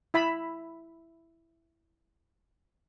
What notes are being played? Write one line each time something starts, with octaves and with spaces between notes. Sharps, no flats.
E4 E5 B5